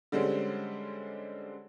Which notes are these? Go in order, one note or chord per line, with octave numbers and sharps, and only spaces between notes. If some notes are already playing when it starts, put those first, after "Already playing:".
D3 G3 G#3 C4 C#4